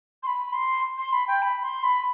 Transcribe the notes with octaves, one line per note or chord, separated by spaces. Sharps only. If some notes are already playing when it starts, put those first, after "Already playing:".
C6
B5
C6
C6
B5
G5
B5
C6
B5